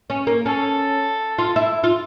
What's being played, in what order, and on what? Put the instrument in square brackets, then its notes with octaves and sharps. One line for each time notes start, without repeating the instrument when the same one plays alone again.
[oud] C#4
A#3
[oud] C#4 [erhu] A4
[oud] F4
E4
F4